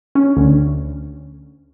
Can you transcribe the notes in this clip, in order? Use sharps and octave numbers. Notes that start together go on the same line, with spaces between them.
C#4
D2